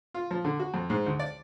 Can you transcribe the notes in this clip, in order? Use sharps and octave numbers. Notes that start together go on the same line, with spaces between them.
F4
F3
D3
F#4
F2
G#2
D2
D5